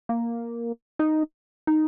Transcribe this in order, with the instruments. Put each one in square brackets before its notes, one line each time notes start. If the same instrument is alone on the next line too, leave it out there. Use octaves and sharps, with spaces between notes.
[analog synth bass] A#3
D#4
D#4